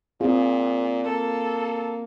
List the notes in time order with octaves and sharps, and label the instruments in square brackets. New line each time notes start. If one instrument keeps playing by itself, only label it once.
[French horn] A#2 [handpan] C4 F4 G#4
[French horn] A#3 [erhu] A4